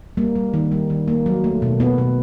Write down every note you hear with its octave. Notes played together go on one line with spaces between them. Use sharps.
G3 A#3
G3
D#3
G3
D#3
A#3
F#3
A3
B2
B2 B3
B2